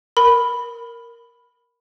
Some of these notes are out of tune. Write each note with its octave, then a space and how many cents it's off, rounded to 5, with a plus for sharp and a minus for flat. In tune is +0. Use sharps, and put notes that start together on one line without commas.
A#4 +0 B5 +0